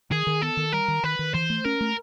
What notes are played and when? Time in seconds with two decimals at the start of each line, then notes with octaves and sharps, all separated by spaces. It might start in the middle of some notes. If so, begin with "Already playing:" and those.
0.11 D#3 G#4
0.27 D#3
0.41 B3 A4
0.57 D#3
0.73 G3 A#4
0.88 D#3
1.03 D#3 B4
1.19 D#3
1.34 E3 C5
1.50 A3
1.65 C#4 A#4
1.81 A3